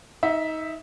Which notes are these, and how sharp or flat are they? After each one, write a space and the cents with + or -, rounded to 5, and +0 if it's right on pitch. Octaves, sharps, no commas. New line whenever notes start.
D#4 +25 E5 -5